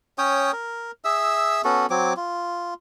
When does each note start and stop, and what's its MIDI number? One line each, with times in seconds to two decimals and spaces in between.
0.18 0.52 61
0.18 0.52 73
0.18 0.52 79
0.18 0.52 87
0.53 0.91 70
1.05 1.62 68
1.05 1.62 76
1.05 1.62 88
1.64 1.86 59
1.64 1.86 61
1.64 1.86 66
1.64 1.86 69
1.90 2.13 54
1.90 2.13 60
1.90 2.13 86
2.17 2.74 65